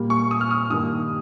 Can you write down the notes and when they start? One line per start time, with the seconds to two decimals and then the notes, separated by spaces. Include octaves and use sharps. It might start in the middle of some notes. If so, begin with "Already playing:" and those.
Already playing: A#2 G3 A#3
0.10 C#6
0.31 D#6
0.41 F6
0.51 D#6
0.70 G2 D#3 A#3 D#6